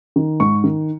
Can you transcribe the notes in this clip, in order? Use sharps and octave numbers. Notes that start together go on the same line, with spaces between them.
D#3
G#2 C#6
D#3